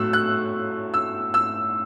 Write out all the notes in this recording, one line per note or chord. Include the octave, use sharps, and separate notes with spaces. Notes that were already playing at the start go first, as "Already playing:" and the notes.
Already playing: A2 F#3 A3 E6 F#6
F#6
E6
E6